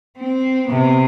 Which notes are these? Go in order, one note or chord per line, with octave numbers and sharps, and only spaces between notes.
C4
C3 B3